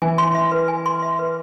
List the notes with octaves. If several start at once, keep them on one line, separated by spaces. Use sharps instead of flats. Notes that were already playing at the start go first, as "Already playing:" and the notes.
E3 G#5
C6
E5
B4
G#5
C6
E5
B4